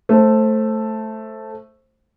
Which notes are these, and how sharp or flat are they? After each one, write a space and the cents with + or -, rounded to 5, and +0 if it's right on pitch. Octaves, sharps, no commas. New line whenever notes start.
A3 +0 C5 +15